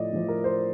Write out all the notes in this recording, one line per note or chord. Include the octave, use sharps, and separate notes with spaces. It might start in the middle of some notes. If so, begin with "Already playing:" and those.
Already playing: A2 F3 D5 D#5
A2 F3
A#4
C5